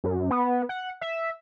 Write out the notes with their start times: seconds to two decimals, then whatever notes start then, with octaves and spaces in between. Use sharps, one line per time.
0.04 F#2
0.31 B3
0.69 F#5
1.01 E5